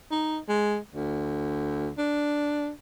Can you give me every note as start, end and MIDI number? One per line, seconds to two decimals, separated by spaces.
0.11 0.38 63
0.48 0.77 56
0.95 1.90 38
1.98 2.70 62